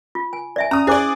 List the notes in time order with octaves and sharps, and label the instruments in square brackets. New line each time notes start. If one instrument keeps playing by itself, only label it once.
[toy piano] F4
G#5
D5 E5 G#5
[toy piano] C#4 [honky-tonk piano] A#5 D#6
[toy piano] E4 C5 D6 [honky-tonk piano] G#4 D5